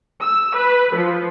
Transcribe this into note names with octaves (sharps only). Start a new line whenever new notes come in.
E6
B4
F3